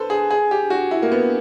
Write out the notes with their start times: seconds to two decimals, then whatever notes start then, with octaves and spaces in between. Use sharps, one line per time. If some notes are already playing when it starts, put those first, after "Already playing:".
Already playing: A4 B4 C5
0.10 G#4
0.31 G#4
0.51 G4
0.70 F#4
0.91 E4
1.02 A#3
1.12 B3